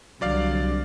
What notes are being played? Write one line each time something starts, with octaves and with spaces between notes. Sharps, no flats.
C2 D3 F#3 D5 F5